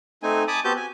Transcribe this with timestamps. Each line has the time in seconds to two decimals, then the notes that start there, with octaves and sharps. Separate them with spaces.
0.23 A3 C4 D#4 G#5
0.48 G#5 A5 B5 D6 D#6
0.64 B3 C4 F#4 G4 A5 G6
0.76 G#5